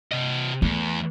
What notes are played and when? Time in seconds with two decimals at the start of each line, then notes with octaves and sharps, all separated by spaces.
0.12 C3 D#5
0.62 E2 A3